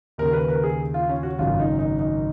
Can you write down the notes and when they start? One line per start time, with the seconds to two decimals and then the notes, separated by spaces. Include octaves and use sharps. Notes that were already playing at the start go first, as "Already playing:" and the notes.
0.18 D#2 C#3 A#4
0.33 B4
0.48 A#4
0.64 G#4
0.94 F4
1.09 C#4
1.23 F#4
1.39 G#1 F#2 C#3 F4
1.59 D#4
1.79 D#4
1.99 D#4